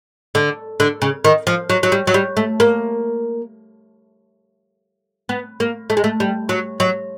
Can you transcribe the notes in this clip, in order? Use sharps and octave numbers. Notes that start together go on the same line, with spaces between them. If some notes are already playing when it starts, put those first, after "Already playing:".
D3
D3
C#3
D#3
F3
F#3
F#3
G3
F#3
G3
A3
A#3
B3
A#3
A3
G#3
A3
G3
F#3
F#3